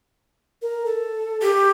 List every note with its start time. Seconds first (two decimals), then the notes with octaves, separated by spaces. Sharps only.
0.62 A#4
0.86 A4
1.43 G4